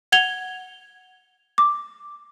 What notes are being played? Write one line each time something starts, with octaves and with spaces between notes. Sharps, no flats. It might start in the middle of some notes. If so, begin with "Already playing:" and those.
F#5 G#6 F7 G7
D6